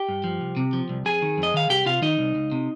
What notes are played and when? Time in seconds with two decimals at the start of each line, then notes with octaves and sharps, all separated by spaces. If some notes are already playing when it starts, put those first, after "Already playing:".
Already playing: G4 G5
0.09 G2
0.24 F3
0.41 C2
0.57 C3
0.73 F3
0.89 C2
1.05 F2 G#4 G#5
1.22 D#3
1.38 F2
1.43 D#5
1.54 D#3 F5
1.69 C2 G4 G5
1.86 C3 F4 F5
2.02 D#3 D#4 D#5
2.19 C2
2.35 C#2
2.52 C3